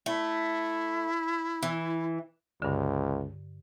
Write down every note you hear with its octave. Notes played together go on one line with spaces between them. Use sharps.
A3 E4
E3
C#2 G2 D3